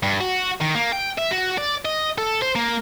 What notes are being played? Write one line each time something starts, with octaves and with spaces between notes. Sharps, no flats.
G2
F#4
D#3
A#3
G5
E5
F#4
D5
D#5
A4
C5
A#3